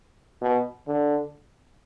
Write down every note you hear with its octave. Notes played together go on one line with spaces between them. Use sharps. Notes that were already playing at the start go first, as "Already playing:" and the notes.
B2
D3